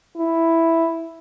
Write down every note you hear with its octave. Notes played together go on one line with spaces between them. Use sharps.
E4